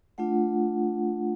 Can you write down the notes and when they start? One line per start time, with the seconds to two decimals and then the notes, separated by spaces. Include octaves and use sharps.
0.18 A3 D4 F4 F#5